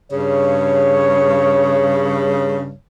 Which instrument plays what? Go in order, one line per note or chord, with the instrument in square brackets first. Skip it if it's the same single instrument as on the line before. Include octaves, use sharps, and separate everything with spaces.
[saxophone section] G2 C#3 [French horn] C#5